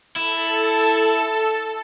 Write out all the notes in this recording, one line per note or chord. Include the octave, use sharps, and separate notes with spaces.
E4 A4 A5